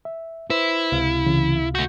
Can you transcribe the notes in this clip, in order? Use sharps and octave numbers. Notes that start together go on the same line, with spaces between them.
E5
E4 B4 C5
C#2 C3 F5
C#3 E3
A3 F#4 G6